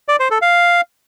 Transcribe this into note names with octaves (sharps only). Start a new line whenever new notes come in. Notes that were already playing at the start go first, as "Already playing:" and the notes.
D5
C5
A4
F5